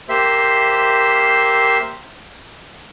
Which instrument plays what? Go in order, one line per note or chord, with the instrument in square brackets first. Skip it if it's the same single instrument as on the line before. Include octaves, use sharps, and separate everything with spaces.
[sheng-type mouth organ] A#3 G4 C5 E5